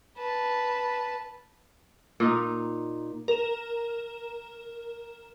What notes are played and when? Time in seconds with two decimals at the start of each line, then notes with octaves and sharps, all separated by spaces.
0.17 B4 A5
2.20 A#2 D#4
3.28 A#4 E7